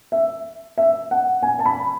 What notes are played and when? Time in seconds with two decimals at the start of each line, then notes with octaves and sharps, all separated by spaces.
0.12 E5
0.78 E5
1.11 F#5
1.43 G#5
1.59 A5
1.66 B5